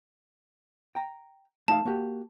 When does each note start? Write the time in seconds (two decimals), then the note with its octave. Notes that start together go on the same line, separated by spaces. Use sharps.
0.95 G5 A#5
1.68 A3 D#4 F5 A5
1.85 A#3 F#4 G4